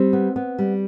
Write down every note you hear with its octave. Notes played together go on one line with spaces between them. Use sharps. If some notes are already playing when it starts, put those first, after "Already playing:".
Already playing: G3 C4
B3
B3
G3